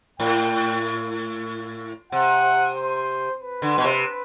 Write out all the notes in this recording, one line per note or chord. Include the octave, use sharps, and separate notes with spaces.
A2 G5
C3 F#5
C5
B4
D3
B2
C3